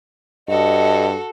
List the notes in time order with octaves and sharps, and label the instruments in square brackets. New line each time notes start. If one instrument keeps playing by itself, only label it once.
[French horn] G2 [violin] F#4 A4 [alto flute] D#5